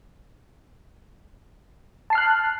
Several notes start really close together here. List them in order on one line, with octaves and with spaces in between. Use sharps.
A5 C7 F6 F#6